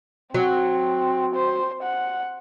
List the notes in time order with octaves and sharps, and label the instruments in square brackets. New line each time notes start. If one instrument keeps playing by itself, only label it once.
[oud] F#3 [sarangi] C4
[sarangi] C5
F#5